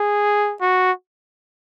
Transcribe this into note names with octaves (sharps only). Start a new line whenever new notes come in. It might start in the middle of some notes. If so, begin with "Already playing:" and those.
Already playing: G#4
F#4